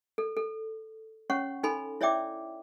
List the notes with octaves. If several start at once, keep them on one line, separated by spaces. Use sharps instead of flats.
A4
A4
C#4 C#5 F#5 C#6
D#4 A4 G#5 B5 C6
E4 C#5 D5 E5 G5 D6